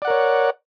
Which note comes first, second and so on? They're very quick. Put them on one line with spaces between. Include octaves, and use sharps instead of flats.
D5 F#5 A#4 C#5